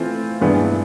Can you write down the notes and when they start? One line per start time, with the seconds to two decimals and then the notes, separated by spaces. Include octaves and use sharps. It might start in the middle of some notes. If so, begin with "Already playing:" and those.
Already playing: E3 A3 C4 F4
0.41 G2 E3 G#3 B3 D4